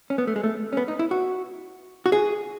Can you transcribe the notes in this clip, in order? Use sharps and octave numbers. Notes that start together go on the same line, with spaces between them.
C#4
B3
A3
G#3
A3
C#4
B3
D#4
E4
F#4
F#4
G#4